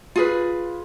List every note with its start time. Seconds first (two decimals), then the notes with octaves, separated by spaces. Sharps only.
0.16 F4 G#4 B4